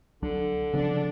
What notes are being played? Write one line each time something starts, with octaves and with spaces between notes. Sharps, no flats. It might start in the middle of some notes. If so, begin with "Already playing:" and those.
C2 D3 F#3 D4
C#3 F3 B3 D4